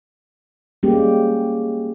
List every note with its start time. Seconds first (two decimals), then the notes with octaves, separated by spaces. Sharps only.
0.83 G3 G#3 A#3 C#4 G4